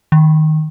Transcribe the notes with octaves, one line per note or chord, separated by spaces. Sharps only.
D#3